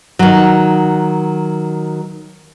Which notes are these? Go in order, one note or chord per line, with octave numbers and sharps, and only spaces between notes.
D#3 F#3